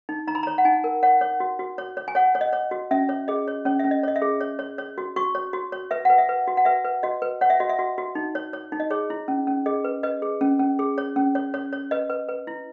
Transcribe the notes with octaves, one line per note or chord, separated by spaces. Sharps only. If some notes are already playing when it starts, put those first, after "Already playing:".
D#4
D#4 A#5
B5
C#5 A#5
F#5
D#4 G#5
A#4
C#5 F#5
C#5
F#4
F#4
C#5
C#5
G#5
C#5 F#5
C#5
D#5
C#5
F#4
C#4 E5
C#5
G#4 D#5
C#5
C#4 C#5
C#4 E5
D#5
C#5 D#5
E5
G#4
C#5
C#5
C#5
F#4
F#4 C#6
C#5
F#4
C#5
B4 E5
B4 F#5
E5
B4
F#4
F#5
B4 E5
B4
F#4 D#5
B4
C#5 F#5
E5
F#4 D#5
E5
F#4
F#4
D#4
C#5
C#5
D#4
D#5
G#4 C#5
E4
C#4
C#4
G#4 D#5
B4
B4 D#5
G#4
C#4
C#4
G#4
C#5
C#4
C#5
C#5
C#5
B4 D#5
B4
B4
E4